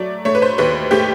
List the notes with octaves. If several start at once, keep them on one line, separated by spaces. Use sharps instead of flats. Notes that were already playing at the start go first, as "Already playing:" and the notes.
Already playing: F#3 A3 D5
A3 C#5
B4
C5
D#2 B4
A3 G4